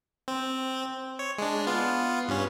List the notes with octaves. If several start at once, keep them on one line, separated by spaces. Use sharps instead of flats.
C4
C#5
G#3 D4
B3 F4
G2 C#4